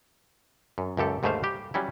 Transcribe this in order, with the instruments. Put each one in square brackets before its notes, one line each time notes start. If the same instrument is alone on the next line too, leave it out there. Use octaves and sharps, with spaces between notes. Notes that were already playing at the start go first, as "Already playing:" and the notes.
[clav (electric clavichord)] F#2
C#2 F#2 G4 A4
D#2 G#2 D3 A3 C5 F5
G3 G4
F#3 G3 C#4 E4